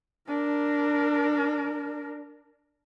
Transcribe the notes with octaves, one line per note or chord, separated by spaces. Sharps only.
D4 A#4